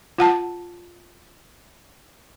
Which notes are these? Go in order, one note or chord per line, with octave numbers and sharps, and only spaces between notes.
F4 F#5 A5